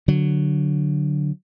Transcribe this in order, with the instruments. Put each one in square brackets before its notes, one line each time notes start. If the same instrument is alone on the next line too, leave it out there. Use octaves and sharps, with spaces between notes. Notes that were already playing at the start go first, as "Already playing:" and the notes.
[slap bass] D3 F#3